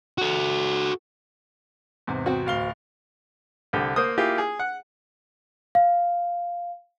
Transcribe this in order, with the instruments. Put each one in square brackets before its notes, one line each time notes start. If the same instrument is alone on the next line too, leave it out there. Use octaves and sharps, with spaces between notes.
[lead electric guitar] F#4 A4
[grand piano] E2 G#2 C3
[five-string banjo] C4 F#4
[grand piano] D1 F5 G7
[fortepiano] C2 D3 G4
A#3 C5 D#6
A#3 E4 F4 G4 G#4
G#4
F#5
[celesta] F5